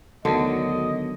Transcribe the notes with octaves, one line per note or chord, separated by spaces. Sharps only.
D2 D3 D#3 F#3 B3 D#5